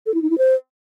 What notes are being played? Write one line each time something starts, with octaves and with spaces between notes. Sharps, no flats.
A4
E4
D#4
E4
C5